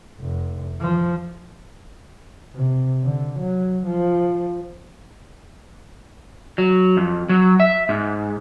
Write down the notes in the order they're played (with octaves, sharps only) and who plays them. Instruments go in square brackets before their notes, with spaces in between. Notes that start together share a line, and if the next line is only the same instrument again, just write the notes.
[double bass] F1
F3
C3
D3
F#3
F3
[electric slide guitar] F#3
F2
F#3
E5
G#2